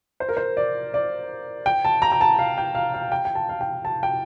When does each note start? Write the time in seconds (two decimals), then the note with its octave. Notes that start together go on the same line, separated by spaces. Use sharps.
0.20 C5
0.29 A#4
0.37 C5
0.57 D5
0.94 D5
1.66 G5
1.85 A5
2.02 A#5
2.12 A#5
2.21 A5
2.39 F5
2.58 G5
2.75 F5
2.94 F5
3.12 G5
3.25 G5
3.35 A5
3.49 F5
3.61 G5
3.85 A5
4.03 G5